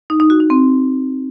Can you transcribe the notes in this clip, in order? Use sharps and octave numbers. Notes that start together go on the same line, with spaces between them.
D#4
D#4
F#4
D#4
C4